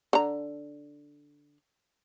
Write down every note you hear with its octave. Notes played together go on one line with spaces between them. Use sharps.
D3 A#5